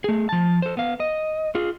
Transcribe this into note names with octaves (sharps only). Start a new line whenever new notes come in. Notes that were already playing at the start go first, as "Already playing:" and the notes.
A3 G#4
F3 A5
A4 C5
B3 F5
D#5
F4 G#4